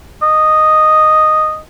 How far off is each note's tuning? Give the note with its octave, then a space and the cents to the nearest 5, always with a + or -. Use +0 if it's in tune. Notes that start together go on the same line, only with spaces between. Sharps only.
D#5 -5